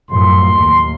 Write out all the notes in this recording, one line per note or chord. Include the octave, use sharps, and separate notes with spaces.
F#2 A2 F3 C6
D#2